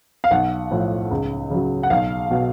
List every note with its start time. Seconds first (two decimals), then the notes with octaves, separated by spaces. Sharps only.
0.24 F5
0.31 B1 F#5
0.71 A2 F3
1.11 C#2
1.50 C#3 F#3
1.83 F#5
1.90 B1 F5
2.30 B2 F#3